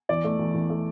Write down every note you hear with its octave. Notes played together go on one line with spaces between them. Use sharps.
E2 D5
A3
E2
E2
A3